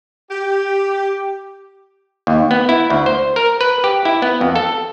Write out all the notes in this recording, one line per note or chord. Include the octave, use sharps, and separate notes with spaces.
G4
D#2
B3
E4
D2
C5
A#4
B4
G4
E4
B3
F2
A4